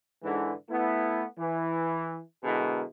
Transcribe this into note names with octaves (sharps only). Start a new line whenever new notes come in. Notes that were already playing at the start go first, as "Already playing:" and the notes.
G#2 D3 E3
A3 B3 E4
E3
B2 D3 G#3 E4 G#4 A#4